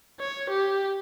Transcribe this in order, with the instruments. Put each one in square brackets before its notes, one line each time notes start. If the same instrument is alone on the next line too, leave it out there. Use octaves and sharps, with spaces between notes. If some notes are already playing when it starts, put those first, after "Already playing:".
[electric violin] C#5
G4